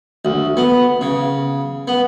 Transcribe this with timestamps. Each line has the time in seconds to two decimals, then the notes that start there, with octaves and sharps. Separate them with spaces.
0.25 D2
0.57 B3
1.01 C#3
1.88 B3